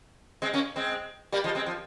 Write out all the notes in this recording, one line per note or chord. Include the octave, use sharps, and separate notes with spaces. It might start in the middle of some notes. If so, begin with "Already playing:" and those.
G#3 C4
A#3 C#4
G#3 C4
G3 A#3
F3 G#3
G#3 C4
F3